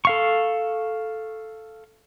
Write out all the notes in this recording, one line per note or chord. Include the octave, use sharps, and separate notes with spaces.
A4 F5 C#6